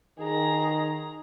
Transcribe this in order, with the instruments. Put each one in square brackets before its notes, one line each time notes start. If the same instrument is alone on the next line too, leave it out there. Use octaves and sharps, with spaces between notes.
[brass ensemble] D#3 [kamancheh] G#4 A#5